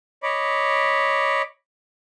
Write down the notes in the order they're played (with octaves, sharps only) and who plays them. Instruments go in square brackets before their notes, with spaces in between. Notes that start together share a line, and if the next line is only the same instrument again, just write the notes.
[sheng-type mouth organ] C#5 D#5 B5 D6